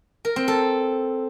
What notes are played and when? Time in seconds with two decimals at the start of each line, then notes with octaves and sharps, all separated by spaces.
0.25 A#4
0.36 C4
0.48 A4